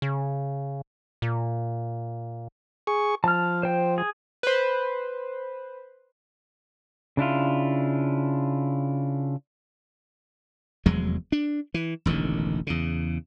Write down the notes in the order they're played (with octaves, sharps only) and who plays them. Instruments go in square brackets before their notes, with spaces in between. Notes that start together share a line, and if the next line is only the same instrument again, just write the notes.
[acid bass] C#3
A#2
[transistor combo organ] G#4 C#6
[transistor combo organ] F3 [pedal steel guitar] A5 F6
[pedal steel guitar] C5 G5
G#4
[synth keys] B4 C5
[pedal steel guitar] C#3 D4 E4 F4
[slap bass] F1 E2 F#3 G#3
D4
E3
E1 A1 D3 D#3
E2 C#3